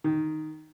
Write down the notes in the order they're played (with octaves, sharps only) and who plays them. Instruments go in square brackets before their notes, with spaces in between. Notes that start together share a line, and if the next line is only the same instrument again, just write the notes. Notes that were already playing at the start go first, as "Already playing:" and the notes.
[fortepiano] D#3